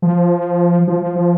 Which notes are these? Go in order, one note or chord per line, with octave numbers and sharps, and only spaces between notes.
F3
F3
F3
F3